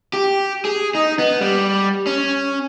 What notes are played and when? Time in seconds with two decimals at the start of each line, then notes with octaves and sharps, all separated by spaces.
0.13 G4
0.65 G#4
0.95 D#4
1.19 B3
1.41 G3
2.07 C#4